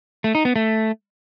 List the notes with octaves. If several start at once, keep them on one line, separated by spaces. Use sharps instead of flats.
A3
D#4
B3
A3